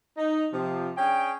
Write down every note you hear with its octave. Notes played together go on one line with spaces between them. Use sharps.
D#4
C3 F3
C#4 D4 G#4 G5